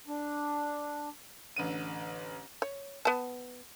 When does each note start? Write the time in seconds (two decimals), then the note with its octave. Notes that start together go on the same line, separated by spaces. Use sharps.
0.08 D4
1.56 A1 D3 D#7
2.62 C#5
3.05 B3 A5